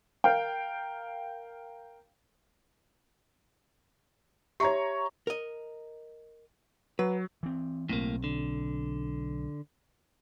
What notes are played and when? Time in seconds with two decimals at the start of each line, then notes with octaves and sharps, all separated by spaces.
0.24 A#4 F5 G5
4.60 G4 C#5 E5 A#5 C#6
5.27 A#4 D#5
6.99 F#3 B4
7.43 E3 C4
7.89 B1 A2 F#3 A#3 C4
8.24 D3